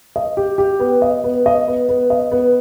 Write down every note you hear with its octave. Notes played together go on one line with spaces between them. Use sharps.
D#5
G4
G4
B3
D#5
B3
D#5
B3
B3
D#5
B3